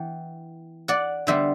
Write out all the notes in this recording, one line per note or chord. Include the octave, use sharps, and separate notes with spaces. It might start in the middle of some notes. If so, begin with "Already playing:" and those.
Already playing: E3 B3 G5
D5 F#5
D3 G3 B3 C5 E5